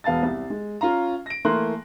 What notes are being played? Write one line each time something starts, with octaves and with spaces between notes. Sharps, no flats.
E1 B3 F5 A5 A6
C2
G#3
C#4 F4 F5 A#5
A#6 D7
E3 A3 A#3 A#5 C6 F#6